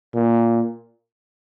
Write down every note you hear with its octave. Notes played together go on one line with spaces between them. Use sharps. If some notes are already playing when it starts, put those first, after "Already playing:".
A#2